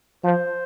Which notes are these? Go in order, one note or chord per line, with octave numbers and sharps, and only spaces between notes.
F3 C5